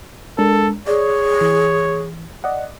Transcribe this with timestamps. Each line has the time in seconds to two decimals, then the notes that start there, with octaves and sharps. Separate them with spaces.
0.38 G#3 D4 A4 A#4
0.87 G#4 C#5 D5
1.41 E3
2.44 D5 D#5 F#5